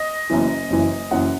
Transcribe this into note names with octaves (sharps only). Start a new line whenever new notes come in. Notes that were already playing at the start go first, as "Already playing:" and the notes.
Already playing: D#5
F#1 F#2 E3
F#1 F#2 E3
F#1 F#2 E3 F#5